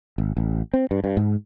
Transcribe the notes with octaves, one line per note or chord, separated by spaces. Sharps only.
G#1
A1
C4
G2
G2
G#2